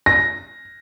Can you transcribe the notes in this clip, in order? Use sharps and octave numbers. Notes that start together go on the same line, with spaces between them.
A#6